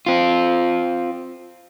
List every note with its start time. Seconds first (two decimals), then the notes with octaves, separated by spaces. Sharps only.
0.06 C4 F4